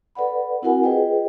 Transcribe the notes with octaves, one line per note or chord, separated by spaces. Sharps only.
A4 B4 D5 F#5 B5
C4 E4 F#4 A#4 F#5 G#5
F4 G#4 B4 C5 D#5 G5